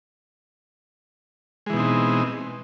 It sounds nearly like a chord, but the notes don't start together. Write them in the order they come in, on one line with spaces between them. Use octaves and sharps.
G#3 E3 B2 D#4 C4